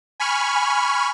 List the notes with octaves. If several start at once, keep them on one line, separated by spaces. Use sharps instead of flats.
G#5 B5 C#6 F6